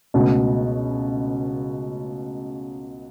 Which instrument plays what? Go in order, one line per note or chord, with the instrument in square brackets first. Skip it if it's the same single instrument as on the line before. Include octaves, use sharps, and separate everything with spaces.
[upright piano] C#2 B2 A3